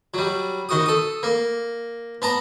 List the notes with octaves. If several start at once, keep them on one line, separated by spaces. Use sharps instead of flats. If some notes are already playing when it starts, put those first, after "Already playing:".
F#3 G3
D#3 F#4 D#6
A4 D#6
A#3
B3 A5 A#5